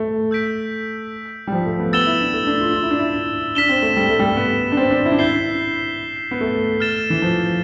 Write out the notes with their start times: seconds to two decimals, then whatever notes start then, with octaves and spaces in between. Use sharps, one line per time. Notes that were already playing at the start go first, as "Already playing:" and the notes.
Already playing: A3
0.31 E6 G6 B6 D7
1.47 G3
1.52 F3
1.66 A3
1.80 B3
1.93 B3 E6 A6 E7 G7
2.06 E4
2.21 D4
2.34 A3
2.47 D4
2.61 F4
2.75 F4
2.83 E4
2.91 D4
2.99 E4
3.55 D4 F6 B6 E7 G7
3.69 C4
3.82 A3
3.96 G3
4.09 A3
4.19 G3
4.23 A3
4.37 B3
4.72 D4
4.77 C4
4.91 D4
5.06 E4
5.12 D4
5.19 E4 G6 C7 G7
6.31 B3
6.41 A3
6.80 F6 A6 E7
7.10 E3
7.22 F3